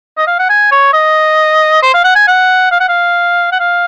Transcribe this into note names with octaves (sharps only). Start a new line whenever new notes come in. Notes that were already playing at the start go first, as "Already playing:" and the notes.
D#5
F5
F#5
G#5
C#5
D#5
C5
F5
F#5
G#5
F#5
F5
F#5
F5
F#5
F5